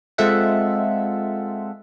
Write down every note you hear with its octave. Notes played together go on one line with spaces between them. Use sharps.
G#3 C4 F4 A4 E5 F#5